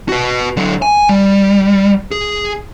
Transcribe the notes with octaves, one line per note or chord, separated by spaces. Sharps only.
F#4 B4
D3 F#3
G#5
G3
G#4